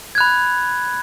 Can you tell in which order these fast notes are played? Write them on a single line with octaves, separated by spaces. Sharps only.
G#6 F#6 B5